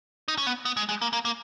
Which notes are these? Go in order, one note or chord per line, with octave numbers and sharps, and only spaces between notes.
D#4
C#4
B3
B3
G#3
G#3
A#3
A#3
A#3